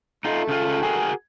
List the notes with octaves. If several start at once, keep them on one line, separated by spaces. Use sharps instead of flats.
A3 D#4 F4
C#3 F4
F#4 G#4 A#4